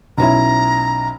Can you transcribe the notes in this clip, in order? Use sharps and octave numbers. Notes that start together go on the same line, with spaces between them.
B1 C#4 E4 A#5